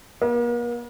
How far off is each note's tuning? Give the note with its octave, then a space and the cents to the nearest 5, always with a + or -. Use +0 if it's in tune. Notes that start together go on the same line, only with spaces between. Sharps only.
A#3 +45